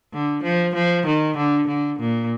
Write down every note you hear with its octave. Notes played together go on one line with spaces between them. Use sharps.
D3
F3
F3
D#3
D3
D3
A#2